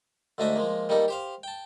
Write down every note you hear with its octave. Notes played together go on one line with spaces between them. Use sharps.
D2 G#2 A3 D4 D#5 E5
F3 G#3 A#3
D#3 G3 A#3 D#4 A4
G4 C5 F5
G5 A5